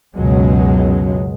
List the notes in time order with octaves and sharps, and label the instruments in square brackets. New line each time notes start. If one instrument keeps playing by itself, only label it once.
[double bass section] C#2 F#2 B2 F#3 G#3